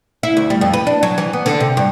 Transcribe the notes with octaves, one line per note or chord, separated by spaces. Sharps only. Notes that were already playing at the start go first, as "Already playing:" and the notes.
E4
D2
G3
F2
B4
D4
F#3
E3
B3
D3
C3
G2